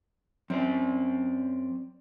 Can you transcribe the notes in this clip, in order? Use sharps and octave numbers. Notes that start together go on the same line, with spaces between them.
F#2 C4 C5 D5